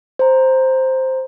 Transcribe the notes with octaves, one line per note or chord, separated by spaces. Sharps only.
C5 A#5